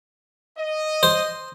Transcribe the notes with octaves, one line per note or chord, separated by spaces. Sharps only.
D#5
C5